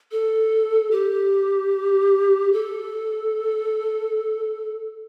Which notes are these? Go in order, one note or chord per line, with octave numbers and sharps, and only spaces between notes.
A4
G4
A4